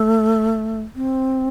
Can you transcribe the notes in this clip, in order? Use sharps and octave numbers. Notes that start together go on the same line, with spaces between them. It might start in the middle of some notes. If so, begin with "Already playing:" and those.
Already playing: A3
C4